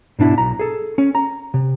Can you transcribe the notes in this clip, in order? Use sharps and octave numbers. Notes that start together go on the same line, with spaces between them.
G#2 B2 D4 E4
B1 A#5
G#4 A4
C#4
A#5
C3